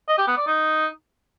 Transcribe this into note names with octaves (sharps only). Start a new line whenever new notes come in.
D#5
G4
B3
D5
D#4